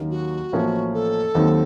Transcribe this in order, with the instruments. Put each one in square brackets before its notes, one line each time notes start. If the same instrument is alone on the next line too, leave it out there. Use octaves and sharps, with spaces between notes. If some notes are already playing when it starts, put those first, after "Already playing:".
Already playing: [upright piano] D#2 D#3 F#3 A#3 C#4
[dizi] F#4
[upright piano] A1 A2 F3 A#3 C#4
[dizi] A4
[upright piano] D#2 D#3 F#3 C4